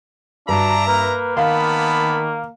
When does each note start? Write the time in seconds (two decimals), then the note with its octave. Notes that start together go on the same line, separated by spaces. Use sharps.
0.49 G2 D4 F#4 E5 A#5
0.87 A#3 B4
1.37 D#3 B3 F5 A5 B5